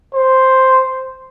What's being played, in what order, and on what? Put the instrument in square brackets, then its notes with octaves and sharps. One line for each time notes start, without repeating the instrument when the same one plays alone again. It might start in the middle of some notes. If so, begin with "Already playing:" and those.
[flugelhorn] C5